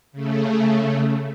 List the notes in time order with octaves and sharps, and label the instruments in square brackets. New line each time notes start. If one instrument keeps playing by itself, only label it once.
[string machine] C#3 A3